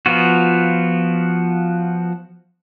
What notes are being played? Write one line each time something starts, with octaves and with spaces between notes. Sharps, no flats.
F3 B3 F4 F#4